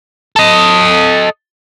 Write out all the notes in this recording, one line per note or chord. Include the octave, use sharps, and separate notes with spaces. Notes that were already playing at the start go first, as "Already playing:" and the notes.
A4 D#5